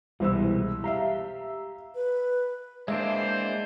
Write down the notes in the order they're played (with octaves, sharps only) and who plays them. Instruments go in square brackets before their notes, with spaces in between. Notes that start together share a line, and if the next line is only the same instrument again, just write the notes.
[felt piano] C2 C5 E6 [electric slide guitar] B2 E3 G#3
[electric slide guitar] G4 F5 [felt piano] E5 A#5
[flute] B4
[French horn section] E3 C5 [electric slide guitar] G#3 A#3 D4 [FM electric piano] E5